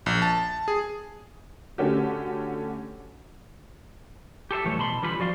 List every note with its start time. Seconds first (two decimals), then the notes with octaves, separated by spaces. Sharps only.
0.06 A#1
0.22 A5
0.68 G#4
1.78 D3 A3 C#4 F#4 G4
4.51 G4 A4 C5 E5
4.65 D2 A2 E3 G3 A3 C#5
4.78 B2 A5 B5 C6
5.02 D3 E3 G3 F4 B5
5.18 E2 F3 F#4 D5 F5 C6